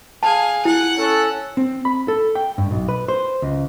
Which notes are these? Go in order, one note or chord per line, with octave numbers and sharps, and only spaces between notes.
G#4 F5 A5
E4 F#5
C#4 A4
C4
B5
A4
G5
G2
B1
B4
C5
C#2